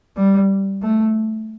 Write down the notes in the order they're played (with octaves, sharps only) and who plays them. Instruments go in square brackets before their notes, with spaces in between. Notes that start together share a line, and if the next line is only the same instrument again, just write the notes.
[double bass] G3
A3